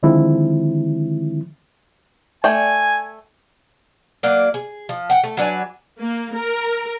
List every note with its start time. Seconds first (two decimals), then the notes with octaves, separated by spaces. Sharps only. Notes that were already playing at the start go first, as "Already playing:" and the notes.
0.03 D3 D#3 F3 G#3 C4 E4
2.44 A3 D5 G5 G#5
4.23 F#3 A#3 D5
4.54 G#4
4.89 F3
5.10 F#5 G5
5.24 A3
5.37 F#3 D4 B4 G#5
5.99 A#3
6.33 A#4